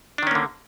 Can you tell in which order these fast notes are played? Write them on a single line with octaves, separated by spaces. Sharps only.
D4 D#3 C#4 A#3 D3